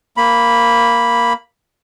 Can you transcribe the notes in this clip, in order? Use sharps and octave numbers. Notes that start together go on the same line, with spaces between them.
A#3 B5